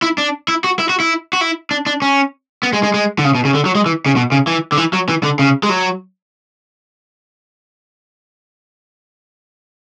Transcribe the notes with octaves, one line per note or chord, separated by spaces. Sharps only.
E4
D4
E4
F#4
E4
F#4
E4
F#4
E4
D4
D4
C#4
B3
G#3
G#3
G#3
D3
C#3
B2
C#3
D3
F#3
G#3
E3
C#3
B2
C#3
E3
D3
E3
F#3
E3
D3
C#3
G#3
F#3